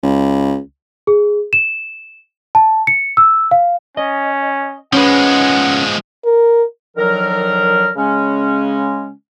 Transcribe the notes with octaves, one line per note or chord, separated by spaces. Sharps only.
C#2
G#4
E7
A5
C#7
E6
F5
C#4 D#5
F3 G#3 C#4 B4 F#5
A#4
D3 D#3 F3 F#3 A#4
C#3 G#3 C#4